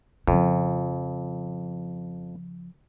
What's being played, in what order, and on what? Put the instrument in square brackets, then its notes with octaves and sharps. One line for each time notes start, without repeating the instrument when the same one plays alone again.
[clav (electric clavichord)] F2 [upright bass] C#3 F3